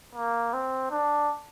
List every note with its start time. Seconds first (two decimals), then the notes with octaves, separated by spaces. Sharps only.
0.15 A#3
0.54 C4
0.91 D4